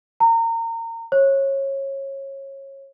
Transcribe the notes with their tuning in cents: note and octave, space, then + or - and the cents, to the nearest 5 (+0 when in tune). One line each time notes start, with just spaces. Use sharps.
A#5 -30
C#5 -25